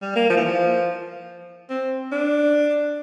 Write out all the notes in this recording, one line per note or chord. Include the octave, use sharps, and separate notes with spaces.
G3
A#3
F3
E3
F3
C4
D4